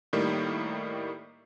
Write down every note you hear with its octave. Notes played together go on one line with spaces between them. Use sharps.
A2 D#3 G3 A#3